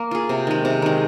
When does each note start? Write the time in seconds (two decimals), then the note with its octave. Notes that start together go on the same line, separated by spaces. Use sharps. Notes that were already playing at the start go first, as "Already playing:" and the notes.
Already playing: A#3
0.11 F4 G#4
0.29 C3
0.47 D#3 G#3
0.65 C3
0.82 D#3 G#3